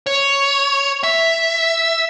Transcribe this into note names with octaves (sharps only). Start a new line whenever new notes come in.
C#5
E5